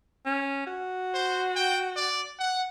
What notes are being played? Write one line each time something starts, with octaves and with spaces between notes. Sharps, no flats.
C#4
F#4
C5
G5
D5
F#5